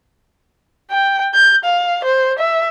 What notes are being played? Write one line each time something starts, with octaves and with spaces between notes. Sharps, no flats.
G5
G6
F5
C5
E5